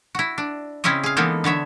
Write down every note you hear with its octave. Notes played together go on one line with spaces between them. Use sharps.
E4 F#4
D4
C#3 C4 C#4 E4 C#5 D#5
G#4 F5
E3 G#3 A#3 B3 D#4 A4
D3 B3 C#5 E5